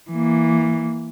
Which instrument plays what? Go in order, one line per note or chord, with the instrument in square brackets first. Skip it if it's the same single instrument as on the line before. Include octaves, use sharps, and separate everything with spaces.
[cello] E3 A#3